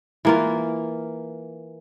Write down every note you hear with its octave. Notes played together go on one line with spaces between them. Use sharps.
E3 A#3 F4